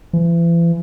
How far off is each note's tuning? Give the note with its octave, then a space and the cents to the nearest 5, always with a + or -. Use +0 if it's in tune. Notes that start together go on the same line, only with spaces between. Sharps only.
E3 +40